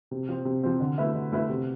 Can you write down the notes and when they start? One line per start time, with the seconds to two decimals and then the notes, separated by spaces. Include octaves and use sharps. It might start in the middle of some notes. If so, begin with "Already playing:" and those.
0.11 C3
0.29 F3 C4
0.45 C3
0.63 F3 C4
0.80 D3
0.98 A3 E4 B4 E5
1.15 D3
1.32 A3 E4 B4 E5
1.49 C3